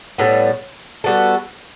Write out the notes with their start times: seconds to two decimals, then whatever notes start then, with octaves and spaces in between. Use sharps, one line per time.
0.18 A2 G3 B3
1.04 G3 B3 F#4 A4